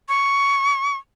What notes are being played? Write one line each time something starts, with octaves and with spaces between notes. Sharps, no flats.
C#6